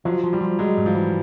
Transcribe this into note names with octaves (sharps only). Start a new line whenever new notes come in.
F3 F#3
F3
G3
F3
F#3 G#3
G#2
F3
E3